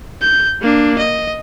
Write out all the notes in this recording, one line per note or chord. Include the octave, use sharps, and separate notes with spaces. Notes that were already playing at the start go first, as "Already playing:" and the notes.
G6
A#3 D4
D#5